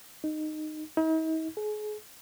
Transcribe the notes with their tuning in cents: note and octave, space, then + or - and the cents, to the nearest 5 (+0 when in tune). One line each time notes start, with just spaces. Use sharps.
D#4 -15
D#4 +45
G#4 +35